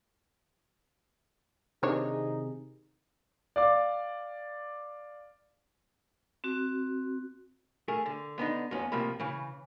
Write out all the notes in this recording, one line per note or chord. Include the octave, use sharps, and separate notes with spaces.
C3 D#3 D4 D#4 G#4 C#5
D5 F5 D6
C4 F#4
A3 G#4 A#4
D3
D3 B3 D4 D#4
F2 B3 C#4
A2 C3 F3 A#3 B5
C#3 E3